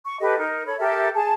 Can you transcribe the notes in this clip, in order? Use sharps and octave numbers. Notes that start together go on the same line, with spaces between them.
C#6
G4 A4 B4 D#5
D#4 A#4
A4 C#5 B5
G4 A4 A#4 E5
G#4 A5